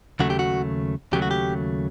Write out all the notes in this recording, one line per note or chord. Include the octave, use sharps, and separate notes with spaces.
D#2 C#3 F#3 A3 F#4
G4
F#4
D#2 C#3 F#3 A3 G4
F#4
G4